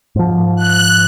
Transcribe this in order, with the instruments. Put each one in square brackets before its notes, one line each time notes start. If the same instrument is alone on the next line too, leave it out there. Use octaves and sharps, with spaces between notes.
[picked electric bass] G#2 F3
[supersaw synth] F#6